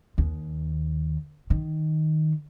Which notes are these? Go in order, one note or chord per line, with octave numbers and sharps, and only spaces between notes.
D#2
D#3